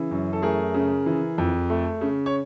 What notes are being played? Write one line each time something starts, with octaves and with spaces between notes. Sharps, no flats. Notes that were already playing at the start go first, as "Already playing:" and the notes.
Already playing: C#3 E3
F#2
A4
A3 G#4 A#4
C#3
E3
F2
A3
C#3
C#5